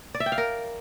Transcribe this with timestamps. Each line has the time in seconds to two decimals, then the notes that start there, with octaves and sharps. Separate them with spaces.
0.14 D5
0.20 E5
0.26 G5
0.32 F5
0.38 A#4